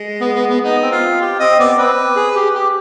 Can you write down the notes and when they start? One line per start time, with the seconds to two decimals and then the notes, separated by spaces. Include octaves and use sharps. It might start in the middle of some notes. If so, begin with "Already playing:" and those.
Already playing: G#3
0.21 B3
0.35 B3
0.50 B3
0.63 B3 D#4
0.82 C4
0.92 F4
1.21 G4
1.39 C4 D#5
1.59 B3 D5
1.78 C4 B4
2.16 G#4
2.35 G4
2.55 G4